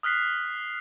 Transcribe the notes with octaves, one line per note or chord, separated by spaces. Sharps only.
D#6 F6 F#6 B6 C7